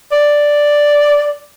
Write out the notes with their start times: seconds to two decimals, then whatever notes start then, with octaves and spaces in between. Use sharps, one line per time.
0.12 D5